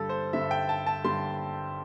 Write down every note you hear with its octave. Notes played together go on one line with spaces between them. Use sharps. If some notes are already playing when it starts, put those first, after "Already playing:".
Already playing: G2 D3 G3 A4
C5
G2 D3 G3 E5
G5
A5
A5
G2 D3 G3 C6